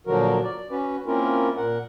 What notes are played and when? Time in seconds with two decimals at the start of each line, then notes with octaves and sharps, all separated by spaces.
0.07 A#2 D3 F3 F#3 F#4 A#4
0.43 D5
0.71 C#4 F#4 B4
1.06 A#3 C4 C#4 E4 F4 A#4
1.56 A#2 A#4 F#5